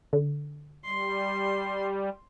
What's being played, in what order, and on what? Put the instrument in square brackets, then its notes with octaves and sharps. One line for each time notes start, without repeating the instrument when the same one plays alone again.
[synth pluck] D3
[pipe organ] G3 [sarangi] C6